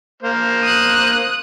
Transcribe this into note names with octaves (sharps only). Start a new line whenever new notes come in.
A#3 C5
D#6 F#6